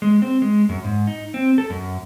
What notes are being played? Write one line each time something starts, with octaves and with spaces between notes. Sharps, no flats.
G#3
C4
G#3
F#2
G#2
D#4
C4
A4
F#2